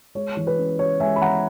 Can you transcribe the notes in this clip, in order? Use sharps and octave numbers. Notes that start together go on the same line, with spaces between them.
G#3 C#5
E3
B4
C#3
C#3 C#5
G#3 E5 G#5
B5
E3 F#5 A#5